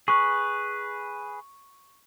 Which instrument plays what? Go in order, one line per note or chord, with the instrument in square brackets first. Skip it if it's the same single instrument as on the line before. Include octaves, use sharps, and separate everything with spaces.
[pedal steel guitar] G#4 B4 [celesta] C#6